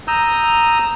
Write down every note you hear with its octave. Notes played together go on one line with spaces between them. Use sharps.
A#5 D#6 E6 G6